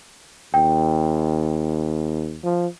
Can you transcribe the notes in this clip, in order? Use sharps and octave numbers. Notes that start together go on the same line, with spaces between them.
D#2 G5
F3